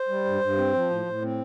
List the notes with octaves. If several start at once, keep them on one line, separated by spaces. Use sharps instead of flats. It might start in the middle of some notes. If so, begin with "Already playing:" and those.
Already playing: C5
G3
G2
G2
C4
F3
A2
A2
C4